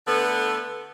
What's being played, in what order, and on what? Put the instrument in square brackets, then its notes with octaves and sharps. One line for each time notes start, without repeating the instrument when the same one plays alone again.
[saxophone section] D3 A3 B3